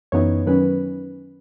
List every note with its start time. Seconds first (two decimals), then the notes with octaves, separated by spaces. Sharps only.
0.12 F#2 E3 B3 D#4 C#5
0.47 D#3 F#3 C#4 B4